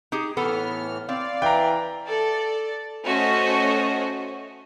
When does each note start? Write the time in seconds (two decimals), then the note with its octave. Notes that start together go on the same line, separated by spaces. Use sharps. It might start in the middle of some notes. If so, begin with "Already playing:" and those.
0.12 D#4 G4 G#4
0.37 A2 E3 B3 A4 F6
1.09 C4 D5 F5
1.42 E3 B4 G5 A#5
2.07 A4 D5
3.04 A3 C#4 F#4 C5 C#5 D#5